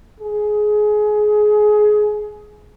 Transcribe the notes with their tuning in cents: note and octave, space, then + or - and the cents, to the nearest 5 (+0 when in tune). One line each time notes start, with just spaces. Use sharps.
G#4 +20